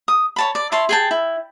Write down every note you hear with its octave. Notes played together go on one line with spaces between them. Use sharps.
D#6
C#5 A5 B5
D5
E4 C#5 A5 C6
G#4 G5 A5
E4